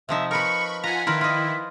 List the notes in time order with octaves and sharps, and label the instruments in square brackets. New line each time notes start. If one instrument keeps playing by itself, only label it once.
[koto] C3 F3 D#4 [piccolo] E5
[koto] A#4 B4 [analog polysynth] B5 C#6 [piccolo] C#7
[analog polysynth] F4 F#5 G#5 [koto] A#5 [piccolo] B6
[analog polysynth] D#3 E4 [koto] F4 A#4 B4
[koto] F4 D#5